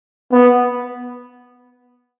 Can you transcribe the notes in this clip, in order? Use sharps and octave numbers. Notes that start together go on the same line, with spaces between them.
B3